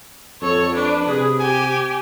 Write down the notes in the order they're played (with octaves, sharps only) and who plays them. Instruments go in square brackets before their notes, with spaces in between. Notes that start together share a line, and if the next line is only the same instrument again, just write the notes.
[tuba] F2 [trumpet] A4 [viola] C#5
[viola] D4 [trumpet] B4
[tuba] C3 [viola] G#4
[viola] G4 [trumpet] G#5